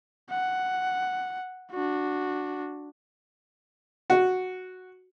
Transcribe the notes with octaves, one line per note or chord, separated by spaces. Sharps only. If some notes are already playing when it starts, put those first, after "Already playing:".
F#5
D4 F#4
F#4